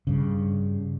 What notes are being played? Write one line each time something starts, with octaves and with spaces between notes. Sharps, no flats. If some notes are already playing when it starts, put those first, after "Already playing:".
G2 C#3